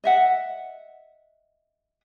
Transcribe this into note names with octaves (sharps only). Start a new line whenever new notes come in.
D#5 E5 F#5